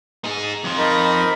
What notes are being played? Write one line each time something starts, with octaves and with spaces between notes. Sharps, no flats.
D#4 G#4
F2 F3
D#4 A#4 B5